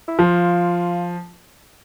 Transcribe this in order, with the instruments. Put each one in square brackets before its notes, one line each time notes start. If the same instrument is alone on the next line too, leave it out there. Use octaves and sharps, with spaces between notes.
[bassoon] E4
[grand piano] F3 [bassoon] F4